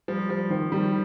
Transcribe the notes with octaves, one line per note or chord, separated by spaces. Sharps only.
F3 G3
F3 G3
D#3 F3
D#3 G3